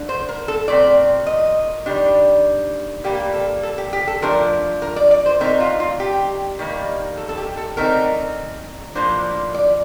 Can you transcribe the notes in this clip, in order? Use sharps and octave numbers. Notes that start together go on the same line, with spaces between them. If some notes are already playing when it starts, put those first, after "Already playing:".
Already playing: D3 A3 D4
C5
A#4
A4
A#2 A3 C4 D5
D#5
D#3 G3 D4
A#2 G3 A#3 G4
A4
A4
G4
G4
A4
F3 A3 D4 A#4
A#4
D5
D5
C5
D3 A3 C4 D#4 A#4
F4
F4
G4
D#3 G3 A#3 D#4
A4
A4
G4
A4
D3 A3 C4 D#4 A#4
A2 F3 A#3 D4 C5
D5